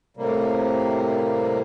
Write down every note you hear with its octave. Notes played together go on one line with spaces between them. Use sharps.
A2 C3 G3 A#3